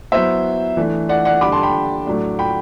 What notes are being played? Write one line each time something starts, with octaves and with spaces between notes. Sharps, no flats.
F#3 B3 E4 C5 E5
E3 A3 D4
D5 F#5
D5 F#5
D3 G3 D4 B5 D6
A5 C6
G5 B5
A2 F#3 A3 D4
G5 B5